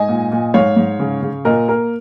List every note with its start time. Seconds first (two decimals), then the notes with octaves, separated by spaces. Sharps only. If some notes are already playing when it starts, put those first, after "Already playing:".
Already playing: G#2 D#5 G#5
0.08 A#2
0.32 A#2
0.54 G#2 C#5 F5
0.77 G#2
0.99 C#3
1.22 C#3
1.45 A#2 A#4 D#5
1.68 A#3 A#4